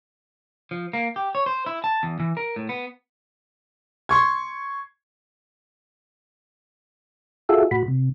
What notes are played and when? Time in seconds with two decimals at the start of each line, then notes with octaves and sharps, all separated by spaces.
0.71 F3
0.93 A#3
1.16 G4
1.35 C#5
1.46 C5
1.66 E4
1.84 A5
2.03 E2
2.20 E3
2.37 A#4
2.56 A2
2.69 B3
4.09 C6 C#6 G#6
7.49 F4 F#4 G#4 A4 E5
7.71 A2 F#4 B5
7.88 C3